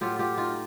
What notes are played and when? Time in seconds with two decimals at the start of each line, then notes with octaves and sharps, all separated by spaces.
0.01 A2 F#3 F4 G4
0.19 F4 G4
0.37 D#4 F4